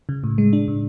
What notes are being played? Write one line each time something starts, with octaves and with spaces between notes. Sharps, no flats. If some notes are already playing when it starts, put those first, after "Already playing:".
C#3
A2
G#3
D4
A2